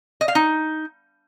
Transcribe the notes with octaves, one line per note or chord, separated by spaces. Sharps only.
D#5
F5
D#4